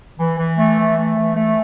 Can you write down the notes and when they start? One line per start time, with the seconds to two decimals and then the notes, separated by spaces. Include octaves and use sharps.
0.19 E3
0.38 E3
0.58 A3
0.77 E3
0.97 A3
1.17 E3
1.36 A3